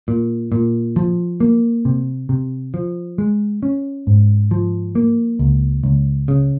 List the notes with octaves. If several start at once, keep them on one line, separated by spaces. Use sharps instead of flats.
A#2
A#2
F3
A#3
C3
C3
F3
G#3
C#4
G#2
F3
A#3
C#2
C#2
C#3